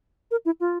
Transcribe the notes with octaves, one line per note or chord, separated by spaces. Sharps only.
A#4
E4
F4